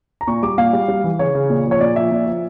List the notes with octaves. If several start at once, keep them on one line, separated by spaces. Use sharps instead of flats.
A#5
A#2 C#6
G3 D6
A#2 F5
G3
G3
E3
C#3 C#5
C#3
A#2
F3
C#5
A#2 D5
F3 E5
A#2
F3